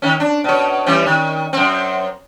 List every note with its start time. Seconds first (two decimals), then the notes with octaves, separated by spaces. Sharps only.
0.02 D#3 C#4
0.20 D4
0.44 B2 C#5
0.86 E3 G3 C#4
1.06 D#3
1.53 F#2 C4